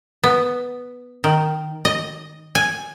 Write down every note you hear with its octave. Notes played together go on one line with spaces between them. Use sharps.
B3
D#3
D#5
G#5